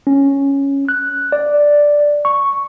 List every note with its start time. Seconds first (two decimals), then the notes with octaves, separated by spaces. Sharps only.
0.07 C#4
0.89 F#6
1.32 D5
2.25 C#6